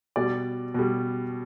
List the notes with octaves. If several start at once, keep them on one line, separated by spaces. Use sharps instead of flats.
B2 G3 D5
B2 G3